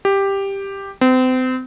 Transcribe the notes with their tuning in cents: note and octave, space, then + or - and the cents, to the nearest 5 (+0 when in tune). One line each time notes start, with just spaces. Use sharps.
G4 +5
C4 -35